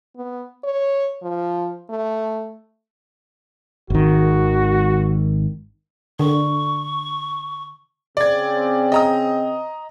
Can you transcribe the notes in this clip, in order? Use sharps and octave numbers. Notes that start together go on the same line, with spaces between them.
B3
C#5
F3
A3
G#1 D#3 F#4
D3 C#6
C#3 C4 D5 G#6
D#5 A#5 D#6